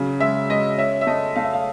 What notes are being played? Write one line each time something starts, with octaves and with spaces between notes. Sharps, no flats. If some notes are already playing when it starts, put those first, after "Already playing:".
Already playing: C#3 F#3
G#3 E5
G#3 D#5
C#4 E5
E5
A3 D#5
A3 F5
E5
F5